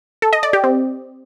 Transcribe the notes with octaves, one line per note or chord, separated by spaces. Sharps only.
A4
D#5
D5
G4
C4